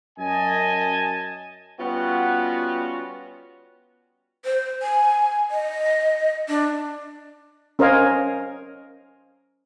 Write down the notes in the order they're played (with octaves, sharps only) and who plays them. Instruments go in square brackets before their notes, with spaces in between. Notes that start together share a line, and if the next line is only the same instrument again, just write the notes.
[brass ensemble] F#2 D#5 G#5 A5
[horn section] G3 B3 C#4 F4 F#4
[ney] C5
G#5
D#5
D4
[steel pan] C#4 A#4 C5 D#5 F5 G#5